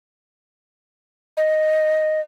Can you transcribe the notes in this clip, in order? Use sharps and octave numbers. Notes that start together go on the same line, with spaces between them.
D#5